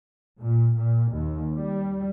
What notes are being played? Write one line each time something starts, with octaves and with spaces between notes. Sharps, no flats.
A#2
A#2
D#2
G3